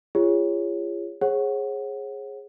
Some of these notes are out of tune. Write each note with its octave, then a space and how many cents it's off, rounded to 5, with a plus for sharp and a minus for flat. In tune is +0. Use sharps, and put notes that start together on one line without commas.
F4 -30 G#4 -35 C#5 +0
G#4 +0 C#5 -40 F#5 +0